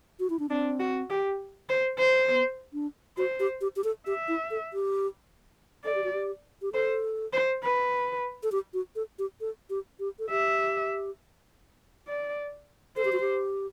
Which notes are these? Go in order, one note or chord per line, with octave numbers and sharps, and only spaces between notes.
F#4
E4
D4
C4 D4
F#4
G4
C5
C5
B3
D4
F#4 C5
G4
G4
G4
A4
G4 E5
E4
A4
G4
A4 D5
G4
F#4
G4
G4
A4 C5
C5
B4
A4
G4
F#4
A4
G4
A4
G4
G4
A4
G4 E5
D5
A4 C5
G4
F#4
G4